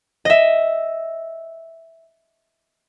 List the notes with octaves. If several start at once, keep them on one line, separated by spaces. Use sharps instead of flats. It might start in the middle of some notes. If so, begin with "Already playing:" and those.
D#5 E5